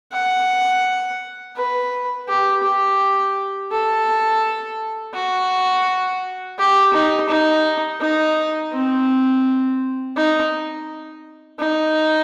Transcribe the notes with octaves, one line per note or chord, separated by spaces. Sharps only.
F#5
B4
G4
G4
A4
F#4
G4
D#4
D#4
D#4
C4
D#4
D#4